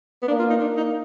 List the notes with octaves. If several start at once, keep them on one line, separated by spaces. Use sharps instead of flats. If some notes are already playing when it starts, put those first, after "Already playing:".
B3
A#3 D4
F4
D#4
A#3 D4
D#4